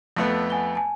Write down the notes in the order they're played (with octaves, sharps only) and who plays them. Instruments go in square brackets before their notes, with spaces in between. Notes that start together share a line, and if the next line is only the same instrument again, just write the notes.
[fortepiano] F2 A3 B3
[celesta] F#5 G#5 G7
G#5 A5